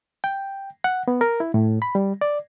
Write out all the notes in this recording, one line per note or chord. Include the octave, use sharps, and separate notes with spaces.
G5
F#5
B3
A#4
E4
A2
B5
G3
D5